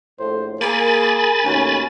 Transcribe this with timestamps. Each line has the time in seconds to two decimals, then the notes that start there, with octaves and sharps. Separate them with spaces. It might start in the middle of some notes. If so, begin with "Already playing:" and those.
0.19 A#1 A2 C5
0.61 A#3 G#4 A#4 G#5 B5 A6
1.44 D#2 B2 A3 C#4